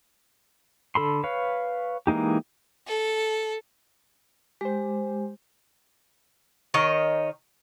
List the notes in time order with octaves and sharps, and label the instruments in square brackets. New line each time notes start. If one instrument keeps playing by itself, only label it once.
[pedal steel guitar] D3 A4 B5 C6
B4 C#5 F5
E3 G#3 A#3 D#4 G4
[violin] A4
[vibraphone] G#3 [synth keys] G4 C5
[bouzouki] D#3 C#5 D#5